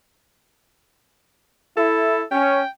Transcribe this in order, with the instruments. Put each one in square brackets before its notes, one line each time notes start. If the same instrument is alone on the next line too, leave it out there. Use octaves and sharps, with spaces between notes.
[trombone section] E4 [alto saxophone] A4
[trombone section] C#4 [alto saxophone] G5